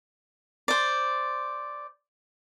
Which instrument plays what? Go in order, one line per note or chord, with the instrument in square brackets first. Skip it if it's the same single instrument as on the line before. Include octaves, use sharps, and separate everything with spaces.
[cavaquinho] C5 D5